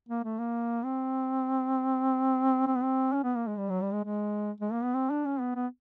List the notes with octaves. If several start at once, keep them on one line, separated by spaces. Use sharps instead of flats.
A#3
A3
A#3
C4
C4
B3
C4
C#4
B3
A#3
G#3
G3
F#3
G3
G#3
G#3
G#3
A#3
B3
C4
D4
C#4
B3
B3